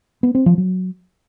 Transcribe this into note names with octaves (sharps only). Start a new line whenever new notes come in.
B3
C4
F3
F#3